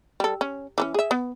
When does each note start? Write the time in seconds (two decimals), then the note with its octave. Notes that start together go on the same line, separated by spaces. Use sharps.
0.20 G3 A4
0.41 C#4
0.78 E3 F3 C#4
0.94 G#4 E5
1.11 B3